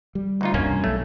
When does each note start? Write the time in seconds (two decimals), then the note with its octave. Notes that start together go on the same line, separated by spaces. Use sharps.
0.15 G3
0.41 D2 D#4 F4
0.54 E1 C2 G2 A#3 C#4
0.84 B1 A3